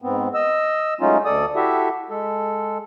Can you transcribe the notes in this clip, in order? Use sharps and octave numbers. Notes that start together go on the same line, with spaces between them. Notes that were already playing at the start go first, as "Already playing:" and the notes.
G#2 B3 C4
D#5 E6
F#3 G#3 A3 C#4 D#4 F4
D2 A4 D5 D#6
E4 F#4 G4 A4 E5
G#3 A4